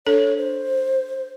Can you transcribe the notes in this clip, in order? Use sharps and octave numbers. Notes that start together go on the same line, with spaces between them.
D4 A4 C#5
C5